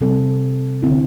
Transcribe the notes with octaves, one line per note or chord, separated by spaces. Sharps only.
C3 G3 C4 A4
D3 C4 E4